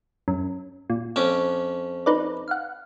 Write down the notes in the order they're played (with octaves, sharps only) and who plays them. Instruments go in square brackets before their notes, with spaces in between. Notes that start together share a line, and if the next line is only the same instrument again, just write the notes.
[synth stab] F#2
A#2
[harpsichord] F2 C#4 D6
[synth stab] D#4 B4 D5
F5 F#5